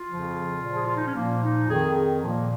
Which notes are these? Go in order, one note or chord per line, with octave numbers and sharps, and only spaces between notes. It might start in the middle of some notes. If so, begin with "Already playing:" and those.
Already playing: F4
F2 C#3 F3
A#2 F3
G#4
F4
D#4
C#4
A#2 F3 A#3
D#4
F2 D#3 G#4
A#2 F3 A#3